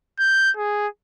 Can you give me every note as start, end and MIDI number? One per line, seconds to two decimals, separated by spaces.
0.19 0.51 91
0.57 0.87 68